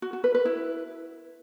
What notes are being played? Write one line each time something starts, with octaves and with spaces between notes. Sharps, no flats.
F#4
F#4
B4
B4
E4